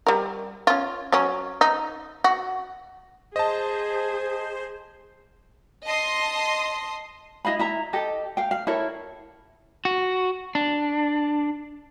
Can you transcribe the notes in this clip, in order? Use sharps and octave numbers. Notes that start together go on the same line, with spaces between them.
G3 A#4
C#4 F4
F#3 C#4
D#4
F#4
G#4 C5 D#5 A5
D#5 A5 C6 D#6
E4 D#5 F5 B5
E4 E5 A#5
G4 A4 D#5
F5 G5
F5
E4 A4 A#4 C#5
F#4
D4